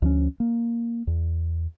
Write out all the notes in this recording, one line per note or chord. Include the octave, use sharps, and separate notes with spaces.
D2 F3 G#3 C#4
A#3
E2